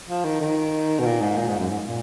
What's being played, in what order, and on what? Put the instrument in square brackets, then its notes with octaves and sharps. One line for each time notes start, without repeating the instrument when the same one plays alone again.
[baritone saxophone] F3
D#3
D#3
B2
A#2
G#2
A#2
G#2
F#2
G#2
A#2